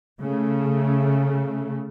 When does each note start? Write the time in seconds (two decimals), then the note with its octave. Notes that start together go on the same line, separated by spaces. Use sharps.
0.20 C#3 A3